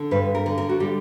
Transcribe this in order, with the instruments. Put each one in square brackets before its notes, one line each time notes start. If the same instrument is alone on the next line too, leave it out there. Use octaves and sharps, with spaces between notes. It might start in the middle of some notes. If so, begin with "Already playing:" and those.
Already playing: [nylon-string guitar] D3
G2 B4
A#4
D3
A#4
F#4
G3 G4